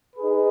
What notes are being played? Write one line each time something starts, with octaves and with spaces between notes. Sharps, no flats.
D#4 G#4 B4